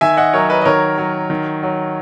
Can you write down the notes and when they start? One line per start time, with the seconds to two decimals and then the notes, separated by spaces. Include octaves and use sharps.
0.01 D#3 E5 G#5
0.17 D#5 F#5
0.33 F#3 A#4 C#5
0.50 B4 D#5
0.61 D#5
0.65 D#3 A#4 C#5
0.98 F#3
1.30 D#3
1.63 F#3